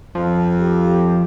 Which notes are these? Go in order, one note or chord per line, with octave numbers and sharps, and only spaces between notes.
F2 F3
G4